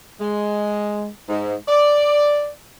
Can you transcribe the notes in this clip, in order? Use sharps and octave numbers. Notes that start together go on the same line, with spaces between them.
G#3
G#2
D5